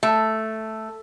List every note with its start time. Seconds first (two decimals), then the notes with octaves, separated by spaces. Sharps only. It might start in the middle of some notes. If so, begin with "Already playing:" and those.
0.03 A3